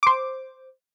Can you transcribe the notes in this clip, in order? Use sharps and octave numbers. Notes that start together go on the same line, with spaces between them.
C5 D6